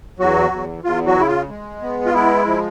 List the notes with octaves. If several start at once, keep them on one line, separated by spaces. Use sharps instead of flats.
E2 F#3 F#4
E2
E2 F4
F#3 F#4
C#3 E4
F4
G#3
B3
F4
G#3 E4
F3